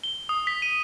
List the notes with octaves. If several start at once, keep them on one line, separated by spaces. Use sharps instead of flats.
G7
D#6
B6
D#7